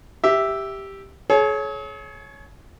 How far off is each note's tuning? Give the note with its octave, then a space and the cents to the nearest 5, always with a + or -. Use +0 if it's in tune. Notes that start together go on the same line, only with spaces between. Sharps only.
G4 +0 E5 +0
G#4 +45 C#5 +0